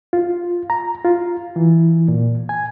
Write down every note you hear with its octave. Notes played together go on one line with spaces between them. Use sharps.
F4
A#5
F4
E3
A#2
G#5